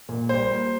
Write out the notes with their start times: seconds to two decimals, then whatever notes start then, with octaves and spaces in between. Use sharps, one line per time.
0.09 A#2
0.29 G3 C5
0.51 A#3